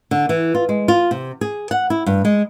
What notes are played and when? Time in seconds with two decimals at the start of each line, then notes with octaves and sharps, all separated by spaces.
0.11 D3
0.29 E3
0.55 F4
0.69 G#3
0.88 F4
1.11 C3
1.41 G#4
1.71 F#5
1.90 E4
2.06 G2
2.25 G#3